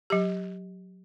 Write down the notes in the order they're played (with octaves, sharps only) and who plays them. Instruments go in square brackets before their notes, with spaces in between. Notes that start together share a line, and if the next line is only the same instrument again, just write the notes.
[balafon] F#3 G4